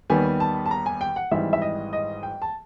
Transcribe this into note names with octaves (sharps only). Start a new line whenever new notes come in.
D#2 D#3 G3 B3 G#5
A5
A5
A#5
G#5
G5
F#5
G#1 G#2 E3 G3 E5
E5
D#5
D#5
G5
A5